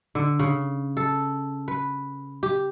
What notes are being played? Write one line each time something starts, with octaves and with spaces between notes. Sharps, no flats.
D3
C#3
A4
B4
G4